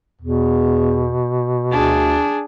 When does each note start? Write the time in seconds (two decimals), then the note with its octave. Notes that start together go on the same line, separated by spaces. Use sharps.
0.21 E2 B2
1.71 D2 D4 G#4